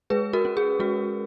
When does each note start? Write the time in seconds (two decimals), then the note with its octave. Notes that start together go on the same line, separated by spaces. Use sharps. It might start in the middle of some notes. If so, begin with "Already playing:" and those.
0.10 G#3 G#4 B4
0.33 F#4 A#4
0.45 C#4
0.57 G#4
0.80 G#3 F#4